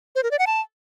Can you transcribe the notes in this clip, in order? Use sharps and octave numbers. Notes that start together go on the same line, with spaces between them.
C5
A#4
D5
F#5
A5